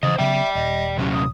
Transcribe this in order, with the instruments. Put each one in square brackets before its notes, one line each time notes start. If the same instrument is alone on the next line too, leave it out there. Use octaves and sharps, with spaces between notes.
[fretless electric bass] C#3 E3 [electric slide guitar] C5 D#5 [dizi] D#6
[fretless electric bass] C#3 F#3 B3 [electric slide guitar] D5 G5 [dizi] E5
[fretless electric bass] D#1 [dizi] D#5
[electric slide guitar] C3 F#3 C#4 [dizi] G4
[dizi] D#6